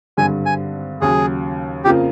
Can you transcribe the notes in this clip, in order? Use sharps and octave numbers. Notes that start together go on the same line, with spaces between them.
G#1 G2 D3 G3 G#5
G#5
D#2 C#3 F#3 G#4
F2 C#3 F3 A#3 G4